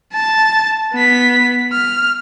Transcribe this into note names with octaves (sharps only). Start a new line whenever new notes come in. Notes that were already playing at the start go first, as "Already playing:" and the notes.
A5 A6
B3 B6
F6